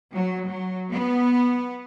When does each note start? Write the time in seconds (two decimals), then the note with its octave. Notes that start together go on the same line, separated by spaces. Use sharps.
0.13 F#3
0.49 F#3
0.92 B3